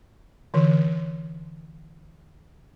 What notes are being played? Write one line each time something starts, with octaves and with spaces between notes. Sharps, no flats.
D3 E3